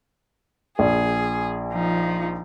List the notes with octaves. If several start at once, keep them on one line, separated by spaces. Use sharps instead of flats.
A#1 G#4
F3 D#4